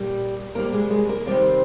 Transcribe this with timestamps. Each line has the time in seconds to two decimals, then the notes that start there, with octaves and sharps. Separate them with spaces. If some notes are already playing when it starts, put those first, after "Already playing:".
Already playing: A#2 G3 G4
0.55 C3 G3 A#3 A#4
0.73 G#3 G#4
0.90 G#3 G#4
1.09 A#3 A#4
1.27 C3 D#3 G3 C4 C5